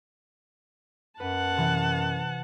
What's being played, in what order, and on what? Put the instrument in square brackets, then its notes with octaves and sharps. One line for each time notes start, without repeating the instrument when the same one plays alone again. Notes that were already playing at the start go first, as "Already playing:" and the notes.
[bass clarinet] F#2 [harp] B4 [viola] F#5 A5
[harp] C3 E3